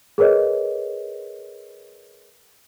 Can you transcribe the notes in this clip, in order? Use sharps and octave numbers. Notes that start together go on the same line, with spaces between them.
G#4 A#4 B4 C#5 D#5